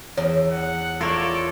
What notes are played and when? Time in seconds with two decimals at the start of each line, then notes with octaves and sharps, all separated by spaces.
0.17 E2 C#5
0.50 F#5
1.01 F4 A4 A#4 C#5 D5 E5